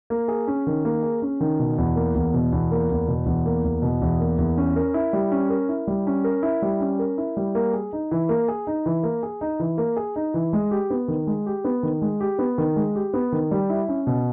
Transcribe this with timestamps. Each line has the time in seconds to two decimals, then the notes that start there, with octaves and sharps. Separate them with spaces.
0.10 A#3
0.28 G#4
0.47 C#4
0.67 D#3
0.85 A#3
1.03 G#4
1.22 C#4
1.40 D#3
1.59 B2
1.78 E2
1.96 A#3
2.15 E2
2.34 B2
2.53 E2
2.71 A#3
2.90 E2
3.08 B2
3.26 E2
3.46 A#3
3.64 E2
3.82 B2
4.02 E2
4.20 A#3
4.38 E2
4.57 C#4
4.76 A#4
4.94 E4
5.13 G3
5.31 C#4
5.50 A#4
5.69 E4
5.87 G3
6.07 C#4
6.24 A#4
6.43 E4
6.62 G3
6.80 C#4
6.99 A#4
7.18 E4
7.37 G3
7.55 A#3
7.73 G#4
7.93 D#4
8.11 E3
8.29 A#3
8.48 G#4
8.67 D#4
8.86 E3
9.03 A#3
9.23 G#4
9.41 D#4
9.60 E3
9.78 A#3
9.97 G#4
10.16 D#4
10.34 E3
10.53 G#3
10.71 G4
10.90 B3
11.08 D#3
11.27 G#3
11.46 G4
11.64 B3
11.83 D#3
12.02 G#3
12.20 G4
12.39 B3
12.58 D#3
12.76 G#3
12.95 G4
13.14 B3
13.32 D#3
13.51 G3
13.69 E4
13.88 C#4
14.07 B2